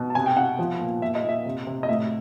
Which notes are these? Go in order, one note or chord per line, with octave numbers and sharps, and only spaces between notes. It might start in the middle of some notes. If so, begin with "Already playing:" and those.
Already playing: B2
A5
C3 G#5
G5
C3 F#5
F3
A#2
A#2 E5
D#5
A#2
E5
C3
C3
D#5
A2 E5